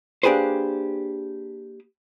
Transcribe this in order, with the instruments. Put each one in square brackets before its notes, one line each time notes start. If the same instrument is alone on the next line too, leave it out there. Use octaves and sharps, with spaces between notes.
[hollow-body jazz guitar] A#3 D4 G4 G#4 B4 C5